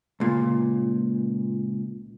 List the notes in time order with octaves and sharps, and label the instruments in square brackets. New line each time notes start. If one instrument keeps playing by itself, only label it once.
[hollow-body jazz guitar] C#2 A#2